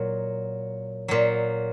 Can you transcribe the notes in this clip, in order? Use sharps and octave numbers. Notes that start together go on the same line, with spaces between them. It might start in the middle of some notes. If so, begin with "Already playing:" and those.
Already playing: A#2 F#3
A#2 F#3